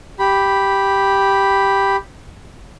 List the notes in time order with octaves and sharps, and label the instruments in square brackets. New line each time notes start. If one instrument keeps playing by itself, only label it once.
[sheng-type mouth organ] G4 B5